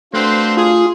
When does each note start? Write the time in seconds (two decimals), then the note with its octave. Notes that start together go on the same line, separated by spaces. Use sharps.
0.14 A3 C4 D4 F#4 B4 C5 F5
0.57 F4 G#4